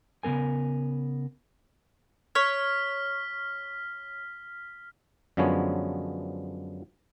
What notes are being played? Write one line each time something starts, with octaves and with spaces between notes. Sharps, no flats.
C#3 E3 B3 A#4 G#5
C#5 F6 B6
F#2 D3 F3 G#3 B3 C#5